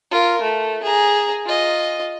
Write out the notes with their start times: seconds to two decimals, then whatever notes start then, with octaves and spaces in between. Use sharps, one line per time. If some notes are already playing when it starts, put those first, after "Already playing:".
0.11 F4 A#4
0.42 A3
0.83 G#4 A#5
1.46 F4 D#5